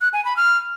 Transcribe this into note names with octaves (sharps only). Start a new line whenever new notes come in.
F#6
G#5
B5
F6